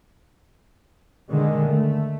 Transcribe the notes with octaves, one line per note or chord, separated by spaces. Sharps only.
D3 D#3 G#3
A3